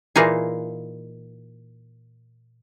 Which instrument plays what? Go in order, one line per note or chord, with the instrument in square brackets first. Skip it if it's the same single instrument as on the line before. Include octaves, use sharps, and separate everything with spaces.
[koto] A#2 E3 A#3 D#4 F4 G#4